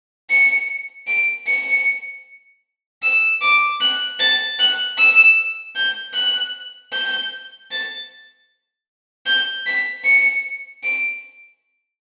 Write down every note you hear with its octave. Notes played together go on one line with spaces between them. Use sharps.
C#7
D7
C#7
E6
D6
F#6
A6
F#6
E6
G6
F#6
G6
A6
G6
B6
C#7
D7